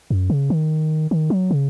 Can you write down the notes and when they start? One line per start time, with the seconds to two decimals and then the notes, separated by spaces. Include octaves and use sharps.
0.10 F#2
0.30 C#3
0.50 D#3
1.11 D#3
1.30 F#3
1.51 C#3